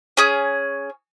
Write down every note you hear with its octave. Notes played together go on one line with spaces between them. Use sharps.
C#4 G#4